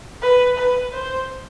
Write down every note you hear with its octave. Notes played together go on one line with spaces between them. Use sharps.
B4
B4
C5